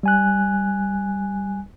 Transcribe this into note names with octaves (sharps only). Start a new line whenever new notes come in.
G3 G#5 F#6